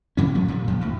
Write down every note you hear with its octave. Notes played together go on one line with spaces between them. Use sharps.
G#2 C#3 C#4
F3 F#3 A3
A#2 D3 G3
F2 F3
D2 A2